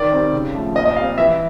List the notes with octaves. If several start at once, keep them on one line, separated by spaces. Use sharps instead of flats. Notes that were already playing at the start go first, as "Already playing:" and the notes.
Already playing: D#3 D5
G3 C4
C#3
F3 A3
A#2 D#5
D#5
G3 C4 F5
E3 E5